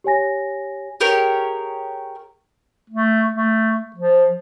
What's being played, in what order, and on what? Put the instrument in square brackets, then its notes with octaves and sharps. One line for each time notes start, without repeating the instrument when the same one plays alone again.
[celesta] G4 C#5 G#5 A#6
[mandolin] G4 G#4 A#4 C#5
[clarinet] A3
A3
F3